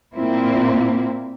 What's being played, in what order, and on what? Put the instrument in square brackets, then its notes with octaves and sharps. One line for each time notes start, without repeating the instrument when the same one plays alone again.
[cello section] A#2 A#3 C4 E4